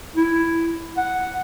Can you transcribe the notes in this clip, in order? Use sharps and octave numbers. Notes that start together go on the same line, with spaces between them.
E4
F#5